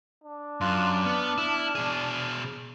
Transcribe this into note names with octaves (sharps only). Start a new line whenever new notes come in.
D4
F#2 F4 C6 F#6
B3 D5 F6
E4 F6
B2 G#4